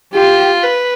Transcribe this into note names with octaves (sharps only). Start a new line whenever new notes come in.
F4 G4
B4